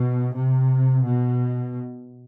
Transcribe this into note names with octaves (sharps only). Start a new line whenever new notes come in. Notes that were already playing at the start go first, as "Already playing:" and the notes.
Already playing: B2
C3
B2